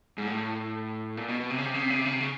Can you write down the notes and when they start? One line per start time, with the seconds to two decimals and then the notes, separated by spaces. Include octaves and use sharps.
0.18 G#2
0.26 A2
1.17 A#2
1.28 B2
1.40 B2
1.50 C3
1.58 C#3
1.66 C3
1.74 C#3
1.82 C3
1.90 C#3
1.97 C3
2.05 C#3
2.13 C3
2.20 C#3